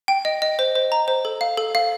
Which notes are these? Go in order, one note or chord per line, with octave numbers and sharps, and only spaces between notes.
G5
D#5
D#5
C5
C5
A#5
C5
A4
F5
A4
F5